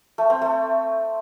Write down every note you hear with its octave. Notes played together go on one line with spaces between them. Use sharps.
A3
C4
A3